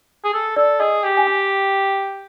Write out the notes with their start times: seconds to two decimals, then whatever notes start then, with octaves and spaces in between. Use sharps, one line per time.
0.24 G#4
0.33 A4
0.56 A4 D5
0.80 G#4 D#5
1.03 G4
1.17 G#5
1.27 G5